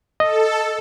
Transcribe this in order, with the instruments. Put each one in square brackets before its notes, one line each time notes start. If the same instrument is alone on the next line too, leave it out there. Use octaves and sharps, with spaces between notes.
[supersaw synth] A4 [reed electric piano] D#5